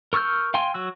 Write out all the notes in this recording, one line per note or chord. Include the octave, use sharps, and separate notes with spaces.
A#4 C#6 E6 F6 G6
F5 G5 G#5 C6
F#3 F#4 E6